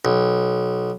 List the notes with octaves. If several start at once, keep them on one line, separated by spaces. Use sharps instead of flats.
B1